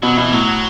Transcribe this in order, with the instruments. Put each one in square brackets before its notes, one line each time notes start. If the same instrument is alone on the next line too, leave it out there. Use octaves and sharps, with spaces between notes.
[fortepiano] B2 [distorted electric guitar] F#3
[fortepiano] B2 [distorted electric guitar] E3
[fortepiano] A2 [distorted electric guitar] F#3